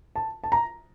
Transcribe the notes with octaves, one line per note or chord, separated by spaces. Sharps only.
A5
A5
A#5